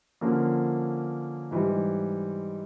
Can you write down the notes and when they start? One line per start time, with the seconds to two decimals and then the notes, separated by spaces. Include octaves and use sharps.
0.21 D3 F3 A#3 C#4
1.51 G#2 E3 G3